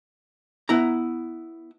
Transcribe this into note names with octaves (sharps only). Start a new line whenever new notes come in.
B3 E4 A#5